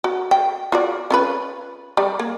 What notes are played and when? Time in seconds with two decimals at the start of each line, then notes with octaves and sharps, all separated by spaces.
0.04 F#4
0.31 G5
0.72 F4 F#4 D5
1.10 C#4 F4 B4
1.97 G3 D5
2.20 A#3